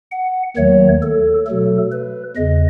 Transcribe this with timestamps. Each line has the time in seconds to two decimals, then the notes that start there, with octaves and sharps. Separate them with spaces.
0.12 F#5
0.57 D#2 D#3 F#3 A3 C#5
1.02 A4
1.46 B2 F#3 A3 A4
1.92 B4
2.36 E2 C#3 D#5